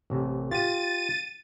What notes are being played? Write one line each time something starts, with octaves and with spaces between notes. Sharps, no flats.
A1 C3
F4 G4 A6 D#7